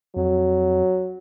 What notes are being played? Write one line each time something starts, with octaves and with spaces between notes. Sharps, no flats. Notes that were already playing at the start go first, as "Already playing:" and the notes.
F2 F#3